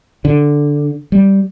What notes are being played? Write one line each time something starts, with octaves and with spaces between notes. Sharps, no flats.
D3
G3